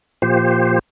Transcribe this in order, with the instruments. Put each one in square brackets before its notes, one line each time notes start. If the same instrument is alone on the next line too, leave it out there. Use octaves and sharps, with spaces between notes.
[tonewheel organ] A#2 F3 G4 C5